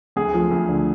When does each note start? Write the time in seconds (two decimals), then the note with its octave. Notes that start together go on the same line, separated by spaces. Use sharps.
0.16 D2 G#4
0.33 F3
0.51 D2
0.69 D3